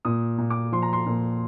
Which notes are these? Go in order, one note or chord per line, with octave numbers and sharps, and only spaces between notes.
A#2 D#6
A#2
D6
F3 C6
A#5
C6
A#2